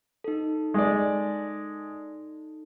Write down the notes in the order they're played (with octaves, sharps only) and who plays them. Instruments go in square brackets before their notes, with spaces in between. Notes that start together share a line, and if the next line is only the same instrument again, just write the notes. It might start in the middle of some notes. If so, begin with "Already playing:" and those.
[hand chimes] D#4 A4
[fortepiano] G#3 D5